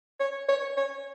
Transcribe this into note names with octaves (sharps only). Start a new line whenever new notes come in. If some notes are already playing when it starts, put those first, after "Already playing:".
C#5
C#5
C#5